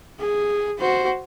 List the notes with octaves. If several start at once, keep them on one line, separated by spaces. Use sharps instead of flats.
G#4
F#4 C5